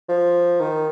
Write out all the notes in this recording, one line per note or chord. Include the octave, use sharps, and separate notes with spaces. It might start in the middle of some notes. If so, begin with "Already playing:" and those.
F3
D#3